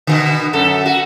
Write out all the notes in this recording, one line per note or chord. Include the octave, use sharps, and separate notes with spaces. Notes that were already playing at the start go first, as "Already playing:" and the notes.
B2 D3
F#2 A4
F#4